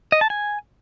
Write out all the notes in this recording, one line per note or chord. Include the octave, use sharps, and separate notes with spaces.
D#5
A5
G#5